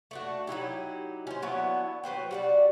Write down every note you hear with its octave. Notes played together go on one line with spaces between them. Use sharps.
A3 D4 F#4
F#3 D#4 E4 G4
C#4 C5
F#3 B3 D4 E4
F#3 B4 C5 G5
G3 F#4 D5